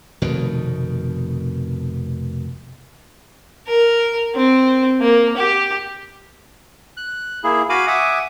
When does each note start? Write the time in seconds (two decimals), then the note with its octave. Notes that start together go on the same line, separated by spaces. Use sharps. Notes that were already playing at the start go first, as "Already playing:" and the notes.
0.22 F1 B2 D#3
3.67 A#4
4.35 C4
5.01 A#3
5.37 G4
6.97 F#6
7.44 A#3 E4 G#4
7.69 F#4 F5 G#5 B5 D6
7.87 E5 F#5 G#5 D6 D#6